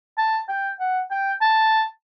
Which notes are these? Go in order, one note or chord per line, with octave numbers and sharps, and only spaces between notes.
A5
G5
F#5
G5
A5